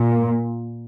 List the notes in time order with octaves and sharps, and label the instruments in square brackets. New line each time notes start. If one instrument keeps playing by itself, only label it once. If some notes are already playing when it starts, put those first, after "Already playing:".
Already playing: [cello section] A#2